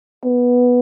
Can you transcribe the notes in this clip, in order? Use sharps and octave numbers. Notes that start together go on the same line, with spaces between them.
B3